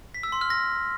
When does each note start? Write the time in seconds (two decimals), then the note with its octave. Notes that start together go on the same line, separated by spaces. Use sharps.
0.14 B6
0.23 E6
0.32 C6
0.41 F6
0.50 A#6